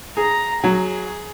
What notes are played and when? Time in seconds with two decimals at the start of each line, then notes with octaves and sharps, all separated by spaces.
0.17 G#4 A#5
0.64 F#3 G#4